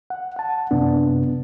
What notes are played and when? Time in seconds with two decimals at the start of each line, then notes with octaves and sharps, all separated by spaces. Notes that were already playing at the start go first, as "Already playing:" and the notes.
0.10 F#5
0.36 F#5 A5
0.71 F#2 C3 B3 D4